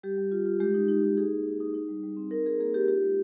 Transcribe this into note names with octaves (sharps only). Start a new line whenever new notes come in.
G3 G4
G3
F4
F4
G#3 G4
D#4
D#4
D#4
D#4 G#4
A#3
D#4
D#4
D#4
G3
G3
C4
D#4 A#4
D#4 G#4
A#3 G#4
D#4 G4
F4 G4
G#3